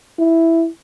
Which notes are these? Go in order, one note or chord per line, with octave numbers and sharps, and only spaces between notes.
E4